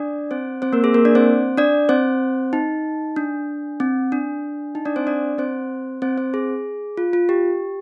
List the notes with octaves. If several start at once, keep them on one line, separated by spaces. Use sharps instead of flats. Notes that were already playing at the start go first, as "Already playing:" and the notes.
Already playing: D4 D5
C4 C5
C4 C5
A#3 A#4
G#4
A#3 A#4
D4 D5
C4 C5
D4 D5
C4 C5
D#4
D4
C4
D4
D#4
D4 D5
C4 C5
D4 D5
C4 C5
C4 C5
C4 C5
G#4
F4
F4
G4